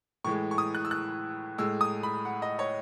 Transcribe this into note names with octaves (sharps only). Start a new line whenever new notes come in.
A2 E3 G#3 C#6
C#6
D#6
F#6
E6
F#6
A2 G#3 E6
D#6
B5
F#5
D#5
C#5